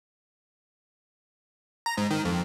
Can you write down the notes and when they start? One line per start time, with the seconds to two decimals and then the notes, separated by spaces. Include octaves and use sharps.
1.86 A#5
1.98 G#2
2.11 D#3
2.25 F2